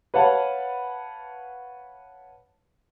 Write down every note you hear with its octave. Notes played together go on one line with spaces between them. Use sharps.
B4 C#5 F5 F#5 A5